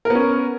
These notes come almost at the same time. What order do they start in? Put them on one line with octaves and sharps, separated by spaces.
A#4 B3 C#4